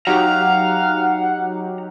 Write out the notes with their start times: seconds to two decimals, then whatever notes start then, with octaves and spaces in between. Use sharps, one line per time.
0.07 F#3 D#4 G4 F5 F#5 A#5